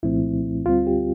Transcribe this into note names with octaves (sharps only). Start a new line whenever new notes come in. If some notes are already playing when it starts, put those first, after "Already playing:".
C2 A#2 F3 A3 C4 E4
D2 D3 G3 C4 F4
G4